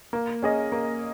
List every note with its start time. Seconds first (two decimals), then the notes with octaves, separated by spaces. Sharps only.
0.13 A#3
0.43 C#4 G#4 D#5
0.72 A#3